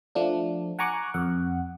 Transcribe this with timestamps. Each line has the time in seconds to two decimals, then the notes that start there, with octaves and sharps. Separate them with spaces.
0.15 F3 A3 D4
0.79 F#5 G#5 A#5 C#6 D6 F#6
1.14 F2 F#5